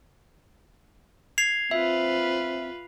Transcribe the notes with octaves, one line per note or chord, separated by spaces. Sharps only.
G#6 C7 F7
C4 F4 B4 E5